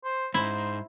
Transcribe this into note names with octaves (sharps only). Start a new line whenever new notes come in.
C5
G#2 E4 C5